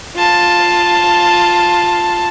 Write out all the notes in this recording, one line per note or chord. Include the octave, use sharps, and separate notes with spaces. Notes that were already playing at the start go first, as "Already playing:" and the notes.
F4 A5